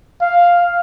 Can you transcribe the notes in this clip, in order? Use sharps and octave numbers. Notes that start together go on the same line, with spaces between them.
F5